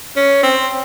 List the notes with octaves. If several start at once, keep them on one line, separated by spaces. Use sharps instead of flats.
C#4
C4